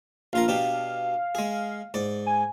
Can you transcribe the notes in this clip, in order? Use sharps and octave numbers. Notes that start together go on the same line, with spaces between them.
A#1 F4 A#4 F5
B2 D4 G4
G#3 G#4
G#2 D5
G#5